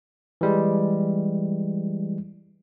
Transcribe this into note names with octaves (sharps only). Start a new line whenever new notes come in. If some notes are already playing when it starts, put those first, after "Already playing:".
E3 G3 G#3